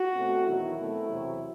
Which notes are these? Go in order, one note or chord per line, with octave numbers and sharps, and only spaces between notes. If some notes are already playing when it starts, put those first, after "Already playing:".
Already playing: F#4
B2 A3 C4
E2 D#3 F#3 B3 E4
B2 A3 C4
E2 C3 F#3 C4